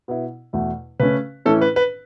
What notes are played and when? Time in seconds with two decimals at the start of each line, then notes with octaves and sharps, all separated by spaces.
0.08 B2 B3 E4
0.53 E2 B2 A3 E4
1.00 C#3 A3 C#4 B4
1.45 A2 E3 C#4 E4 A4
1.61 B4
1.76 B4